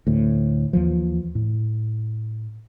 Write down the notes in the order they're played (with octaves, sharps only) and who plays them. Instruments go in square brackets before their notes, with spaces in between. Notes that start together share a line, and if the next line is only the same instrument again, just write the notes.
[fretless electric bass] D2 A2
D#2 E3 F3
A2